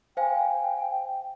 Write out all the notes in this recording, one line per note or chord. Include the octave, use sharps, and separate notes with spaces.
C5 F5 G5 G#5